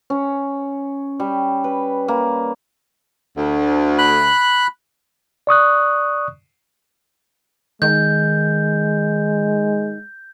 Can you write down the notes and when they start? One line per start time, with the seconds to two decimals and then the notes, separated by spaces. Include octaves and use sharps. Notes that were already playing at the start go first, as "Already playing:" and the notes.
0.10 C#4
1.20 G3
1.64 B4
2.08 A#3
3.37 D2
3.99 B5 F#6
5.47 D5 C#6 D#6 F#6
7.82 D#3 G#3 G6